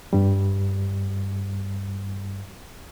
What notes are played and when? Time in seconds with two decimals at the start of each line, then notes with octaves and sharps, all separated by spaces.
0.13 G2 G3